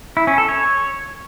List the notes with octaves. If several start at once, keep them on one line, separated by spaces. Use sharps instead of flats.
E4
C#4
A4
C#5